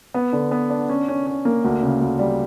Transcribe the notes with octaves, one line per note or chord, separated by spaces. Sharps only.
B3
D3
B3
D4
C#4
C#4
C#4
A#3
D2
C#3
D2
G3